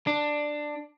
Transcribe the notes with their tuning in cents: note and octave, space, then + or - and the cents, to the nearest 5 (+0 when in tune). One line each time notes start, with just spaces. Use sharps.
D4 +10